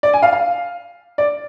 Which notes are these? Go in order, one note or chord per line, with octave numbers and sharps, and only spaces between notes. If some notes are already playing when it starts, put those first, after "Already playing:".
D5
G#5
F5
F5
D5